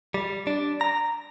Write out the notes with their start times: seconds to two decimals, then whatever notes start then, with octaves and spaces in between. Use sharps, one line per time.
0.14 G3
0.47 D4
0.81 A#5